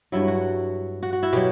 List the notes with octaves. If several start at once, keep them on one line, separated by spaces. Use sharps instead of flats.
G2 F#3 E4
F#4
F#4
F#4
E4
B2 F#3 G4